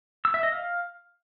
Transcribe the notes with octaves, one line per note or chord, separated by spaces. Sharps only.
E6
E5
D#5
F5